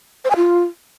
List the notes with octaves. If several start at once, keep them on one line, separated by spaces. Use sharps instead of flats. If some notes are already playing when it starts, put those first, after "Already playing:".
C5
G#5
F4